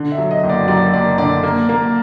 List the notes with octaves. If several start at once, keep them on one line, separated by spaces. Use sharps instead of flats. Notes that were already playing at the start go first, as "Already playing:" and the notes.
Already playing: D3
E5
F#3
D#5
F#1
D5
F#2 D5
F#1 D5
D3 D5
A#3
A#3